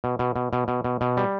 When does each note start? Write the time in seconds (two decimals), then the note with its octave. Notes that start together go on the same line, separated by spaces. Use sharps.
0.04 B2
0.19 B2
0.36 B2
0.53 B2
0.68 B2
0.84 B2
1.01 B2
1.17 G3